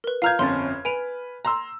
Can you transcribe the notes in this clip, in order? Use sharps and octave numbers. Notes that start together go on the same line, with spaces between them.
A#4 B4
F4 F5 A#5 F6 G6 G#6
G1 F2 C#4 C6 A6
B4 G#5 D7 F7
A#5 C6 E6